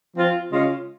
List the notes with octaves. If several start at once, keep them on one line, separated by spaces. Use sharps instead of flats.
F3 C4 F4
C#3 G#3 C#4 F4